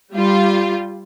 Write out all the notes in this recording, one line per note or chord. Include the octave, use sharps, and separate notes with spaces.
G3 F4